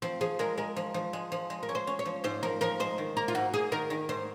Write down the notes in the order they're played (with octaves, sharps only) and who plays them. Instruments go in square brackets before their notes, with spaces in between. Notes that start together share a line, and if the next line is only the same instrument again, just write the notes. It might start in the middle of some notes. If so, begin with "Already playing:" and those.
[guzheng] F3 [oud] C4
[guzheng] F3 [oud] G#4
[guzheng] G#3 [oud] A#4
[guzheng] G#3 [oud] A#4
[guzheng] F3
F3
G#3
F3
G#3
[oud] A#4
[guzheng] C#4
[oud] C5
[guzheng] C#4
[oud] C#5
[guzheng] F3
[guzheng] G#2 [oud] C5
[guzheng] F3 [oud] A#4
[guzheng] F3 [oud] A#4
[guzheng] G#3 [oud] C5
[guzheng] D#3
[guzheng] A#3 [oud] A#4
[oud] F4
[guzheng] G#2 [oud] F#4
[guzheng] A#3 [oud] G#4
[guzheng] D#3 [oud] A#4
[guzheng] D#3
[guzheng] G#2 [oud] C5